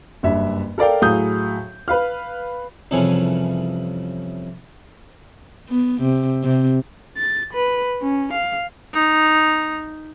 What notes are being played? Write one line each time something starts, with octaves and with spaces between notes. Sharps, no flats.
F#1 G2 E5
A4 A#4 D5 F5 G5
A2 F#3 G#4 F5 D#6 G6
B4 F5 F6
C2 F2 C#3 E3 A4 G#5
B3
C3
C3
A6
B4
C#4
F5
D#4